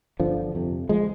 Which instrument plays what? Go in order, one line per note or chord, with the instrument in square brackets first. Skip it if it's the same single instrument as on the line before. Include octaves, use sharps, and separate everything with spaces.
[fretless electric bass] G1 D3 F3
F2 C3
F3 G#3